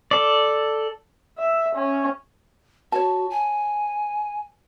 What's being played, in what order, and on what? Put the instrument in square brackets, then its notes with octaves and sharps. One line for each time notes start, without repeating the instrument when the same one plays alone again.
[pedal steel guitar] A4 D5
[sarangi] E5
C#4
[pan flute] F#4 [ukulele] C#5 A5
[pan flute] G#5